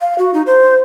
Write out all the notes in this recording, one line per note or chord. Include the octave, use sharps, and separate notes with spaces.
F5
F#4
D#4
C5